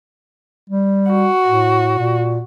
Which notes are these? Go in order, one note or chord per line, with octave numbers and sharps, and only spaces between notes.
G3
F#4
A2
A#2